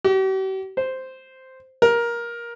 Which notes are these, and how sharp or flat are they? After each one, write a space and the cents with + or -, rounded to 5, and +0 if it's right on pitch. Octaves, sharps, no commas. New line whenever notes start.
G4 -45
C5 -5
A#4 +15